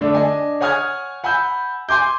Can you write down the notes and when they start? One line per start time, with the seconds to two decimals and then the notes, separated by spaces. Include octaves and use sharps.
0.01 D3 A3 D4
0.14 D4 D#5 G#5
0.61 C#5 F#5 G#5 D#6 F6 G#6
1.24 F#5 G#5 B5 E6 G6
1.89 G#5 C6 D6 G6